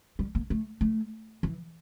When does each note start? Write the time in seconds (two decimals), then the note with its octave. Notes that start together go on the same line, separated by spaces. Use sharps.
0.19 G3
0.35 A#3
0.50 A3
0.81 A3
1.43 E3